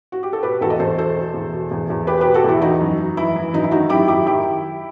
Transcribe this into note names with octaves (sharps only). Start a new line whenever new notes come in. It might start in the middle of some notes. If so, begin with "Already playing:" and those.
F#4
G4
A4
B2 G4 B4
E2 F#4 A4
D#5
E2 A4 C5
B2 A4 C5
B2
E2
B2
E2
E2
B2 G4 B4
B2 G4 B4
F#4 A4
E2 E4 G4
E3 D#4 F#4
F#2
F#2
E3 E4
E3
F#2 D#4
E4
D#3 D#4 F#4
F#2 E4 G4
F#2 E4 G4
D#3 E4 G4